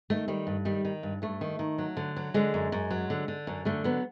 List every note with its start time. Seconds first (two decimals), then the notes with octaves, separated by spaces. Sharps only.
0.10 D#3 A3
0.28 D#3 G3
0.47 G2
0.65 D#3 G3
0.85 D#3
1.03 G2
1.22 G2 A3
1.41 D#3
1.59 D#3
1.78 F#3
1.97 D3
2.16 F#3
2.34 D3 G#3
2.54 F#2
2.72 F#2
2.91 F#3
3.10 D3
3.28 D3
3.47 F#2
3.65 D3 A3
3.84 F#3 B3